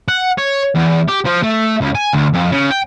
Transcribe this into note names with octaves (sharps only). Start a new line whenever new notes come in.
F#5
C#5
E2
G4
F3
A3
C#2
G#5
D2
F2
C#3
G5